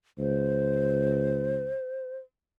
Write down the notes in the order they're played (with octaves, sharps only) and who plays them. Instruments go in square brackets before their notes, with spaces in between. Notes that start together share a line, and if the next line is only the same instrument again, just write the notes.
[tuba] C#2 [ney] C5